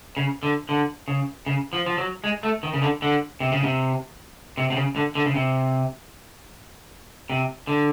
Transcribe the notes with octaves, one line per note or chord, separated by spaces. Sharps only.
C#3
D3
D3
C#3
C#3
F3
F3
F#3
G#3
A3
D#3
C#3
D3
D3
C3
C#3
C3
C3
C3
C#3
D3
D3
C#3
C3
C3
D3